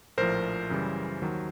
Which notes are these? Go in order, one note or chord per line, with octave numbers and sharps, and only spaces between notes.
A#1 A2 F3 A#4 C5
F#2 C#3 E3 G3
D#2 D#3 F#3